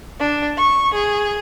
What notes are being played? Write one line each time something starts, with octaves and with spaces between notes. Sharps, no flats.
D4
C#6
G#4